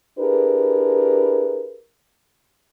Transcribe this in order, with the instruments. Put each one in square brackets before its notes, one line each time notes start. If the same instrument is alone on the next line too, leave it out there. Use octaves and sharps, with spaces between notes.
[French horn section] D4 E4 G4 G#4 A#4 B4